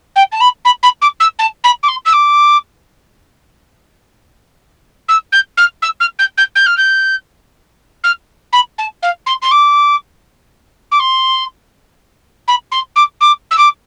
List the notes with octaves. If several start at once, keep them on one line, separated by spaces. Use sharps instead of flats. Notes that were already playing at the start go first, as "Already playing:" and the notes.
G5
A5
B5
B5
B5
D6
E6
A5
B5
D6
C6
E6
D6
E6
G6
F6
E6
F6
G6
G6
G6
F6
G6
F6
B5
A5
F5
C6
C6
D6
D6
C6
B5
C6
D6
D6
E6
D6